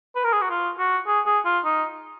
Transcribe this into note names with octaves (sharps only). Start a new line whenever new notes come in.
B4
A#4
G#4
F#4
F4
F#4
G#4
G#4
F4
D#4